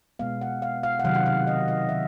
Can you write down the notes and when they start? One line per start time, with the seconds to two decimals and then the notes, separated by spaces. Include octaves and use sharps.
0.19 B2 G#3 B3 F5
0.41 F#5
0.62 F5
0.83 F5
0.99 F#5
1.04 C3 D#3 F#3 F5
1.15 F#5
1.26 F5
1.47 D#5
1.68 D#5
1.89 D#3 F#3 E5